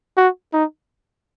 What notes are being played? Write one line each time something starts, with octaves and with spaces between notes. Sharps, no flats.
F#4
D#4